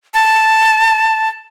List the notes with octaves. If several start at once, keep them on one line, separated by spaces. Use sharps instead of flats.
A5